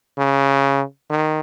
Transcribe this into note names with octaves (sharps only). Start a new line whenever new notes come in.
C#3
D#3